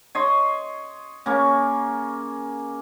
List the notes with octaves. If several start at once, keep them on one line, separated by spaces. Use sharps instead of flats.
C#5 D#5 C6
C#3 A#3 C#4